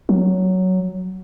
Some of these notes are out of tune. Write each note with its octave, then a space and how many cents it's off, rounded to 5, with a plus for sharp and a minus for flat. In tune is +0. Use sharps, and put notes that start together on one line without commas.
F#3 +5